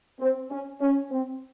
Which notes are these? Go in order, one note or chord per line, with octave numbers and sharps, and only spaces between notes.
C4
C#4
C#4
C4